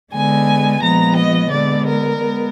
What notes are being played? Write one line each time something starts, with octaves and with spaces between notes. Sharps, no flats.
D3 G#3 B3 G#5
A#2 F3 G#3 B3 A#5
D#5
D3 G#3 B3 D5
A#4
G#3 B3